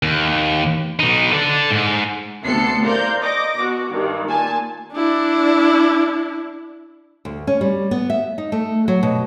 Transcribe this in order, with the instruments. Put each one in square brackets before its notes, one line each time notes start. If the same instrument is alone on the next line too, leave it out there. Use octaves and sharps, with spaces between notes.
[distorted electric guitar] D#2
B2 D#4
A4 D5
G#2
[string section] D2 C3 B3 A4 C7 C#7
A#4 C5 D5 F5 A#5 G6
D#5 D6 A#6
B2 F#4
G2 D#3
A#2 G#5 A5
[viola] D4 E4
[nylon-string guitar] D2
C#4
G3
B3
E5
D#4
A3
F#3
B2